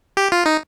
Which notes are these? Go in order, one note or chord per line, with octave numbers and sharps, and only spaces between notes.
G4
F4
D#4